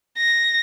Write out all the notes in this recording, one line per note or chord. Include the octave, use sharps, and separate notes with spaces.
A#6